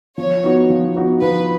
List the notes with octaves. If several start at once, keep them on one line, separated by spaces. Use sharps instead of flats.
F3 C#5
B3 D#4 F#4
F3
B3 D#4 F#4
F3 B4